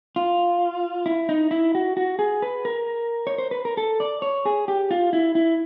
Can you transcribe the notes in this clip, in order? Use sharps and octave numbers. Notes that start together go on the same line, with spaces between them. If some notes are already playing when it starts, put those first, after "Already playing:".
F4
E4
D#4
E4
F#4
F#4
G#4
B4
A#4
C#5
C5
B4
A#4
A4
D5
C#5
G#4
G4
F4
E4
E4